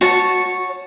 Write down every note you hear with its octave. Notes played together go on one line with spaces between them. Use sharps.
F#4 C#5 A5